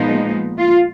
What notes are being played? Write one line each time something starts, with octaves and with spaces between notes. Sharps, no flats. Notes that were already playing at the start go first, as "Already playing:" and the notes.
Already playing: A#2 F3 G#3 B3 D#4
F4